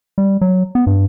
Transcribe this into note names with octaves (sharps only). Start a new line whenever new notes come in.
G3
F#3
B3
G2